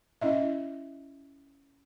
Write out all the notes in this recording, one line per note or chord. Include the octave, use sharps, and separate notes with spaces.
C#4 E4 D#5 E5